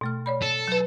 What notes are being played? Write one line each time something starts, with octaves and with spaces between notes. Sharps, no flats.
B2 A3 F6
C#5 D5 B5
A4
F#3 B4